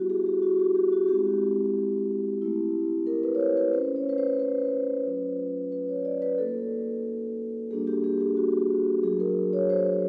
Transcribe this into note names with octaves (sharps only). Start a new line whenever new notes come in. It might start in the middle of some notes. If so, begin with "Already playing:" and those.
Already playing: G3 B3 E4 F#4 G4
G#4
G4
F#4
G4
G4
F#4
G#3 C4 E4 G4
A3 C4 E4
A#4
B4
C#5
C5
B4
A3 C#4 F4 C5
C#5
B4
C5
B4
F#3 A3 C#4 F4
B4
C#5
D5
B4
A#3 D#4 F#4 A4
G3 A#3 D4 F#4 G#4
G4
G#4
G4
F#4
F#3 A3 D4 F#4 G#4
A#4
C#5
C5